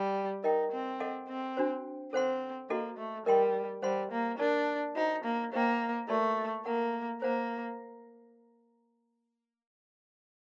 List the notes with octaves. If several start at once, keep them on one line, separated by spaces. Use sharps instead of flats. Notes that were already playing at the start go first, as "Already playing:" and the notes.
Already playing: G3
D#4 A#4 D#5 G5
C4
A4 D#5 F#5
C4
D4 F#4 C5
C4 A4 C5 F#5 C6
A#3 F#4 A4 D#5
A3
G3 A#4 D#5 G5 C6
G3 C5 F#5 C6
A#3
D4 A#4 D5 A5
D#4 F#4 C5 F#5 A#5
A#3
A#3 C5 D#5 G5
A3 F#4 A#4 D5 A5 C6
A#3 A#4 F#5 A#5
A#3 C5 F#5 A#5